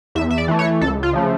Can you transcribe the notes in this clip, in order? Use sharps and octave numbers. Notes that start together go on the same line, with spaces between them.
E2 E5
E5
D5
E3 A3
C#5
C#2 A4
F4
C#3 F3 A3